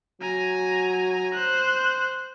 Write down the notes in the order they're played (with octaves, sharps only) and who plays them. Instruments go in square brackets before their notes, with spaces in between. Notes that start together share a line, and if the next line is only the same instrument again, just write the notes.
[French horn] F#3 [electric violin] G#5 A#5
[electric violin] C5 F#6